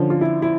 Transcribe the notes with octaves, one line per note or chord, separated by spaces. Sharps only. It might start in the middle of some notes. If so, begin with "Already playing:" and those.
Already playing: D3 F3 C#4
F4
E4
E4